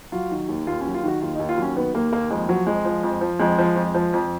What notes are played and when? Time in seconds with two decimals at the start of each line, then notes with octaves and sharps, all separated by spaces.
0.12 F#3 F4
0.31 D#3
0.48 D#2
0.67 D#2 F4
0.81 C#4
0.86 F#3
0.94 F4
1.04 D#3 F#4
1.21 D#2 F4
1.35 D#2 D#4
1.49 F4
1.57 F#3 C#4
1.76 D#3 B3
1.94 D#2 A#3
2.12 D#2 A#3
2.30 F2 G#3
2.49 F3 F#3
2.67 F2 G#3
2.85 F3
3.03 F2
3.21 F3
3.39 F2 G#3
3.58 F3
3.76 F2
3.95 F3
4.13 F2